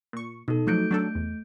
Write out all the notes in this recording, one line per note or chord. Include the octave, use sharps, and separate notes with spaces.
A#2 C#6
B2 D#4 A4
F3 F#3 A3 F#4 G6 D7
F#3 D4 A4
E2